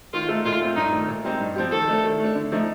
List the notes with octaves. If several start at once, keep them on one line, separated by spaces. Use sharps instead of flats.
D#3 F4
A3 D#4 A4
A#2 F4
A3 C4
G2 D#4
D#3 A3
A#2
G3 C4 D#4 G4
G2
F3 C4 G4
D#3 A4
A3 D4
D#3
A3 D4
D3
F3 A3 D#4